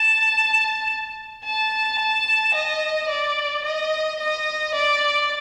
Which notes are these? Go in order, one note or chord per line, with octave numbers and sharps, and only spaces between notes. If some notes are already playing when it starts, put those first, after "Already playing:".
Already playing: A5
A5
A5
D#5
D5
D#5
D#5
D5